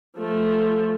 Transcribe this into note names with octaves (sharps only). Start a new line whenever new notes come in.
F3 A3